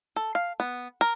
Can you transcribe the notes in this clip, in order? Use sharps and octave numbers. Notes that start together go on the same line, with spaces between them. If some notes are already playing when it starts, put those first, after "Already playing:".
A4
F5
B3
A#4